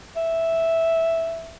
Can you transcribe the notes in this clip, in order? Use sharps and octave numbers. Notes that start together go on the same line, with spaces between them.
E5